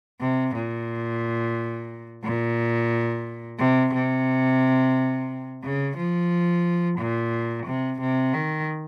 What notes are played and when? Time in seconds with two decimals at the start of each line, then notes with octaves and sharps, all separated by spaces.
0.21 C3
0.55 A#2
2.24 A#2
3.59 C3
3.94 C3
5.63 C#3
5.97 F3
6.98 A#2
7.66 C3
8.00 C3
8.34 D#3